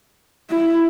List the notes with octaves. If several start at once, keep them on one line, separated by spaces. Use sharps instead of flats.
E4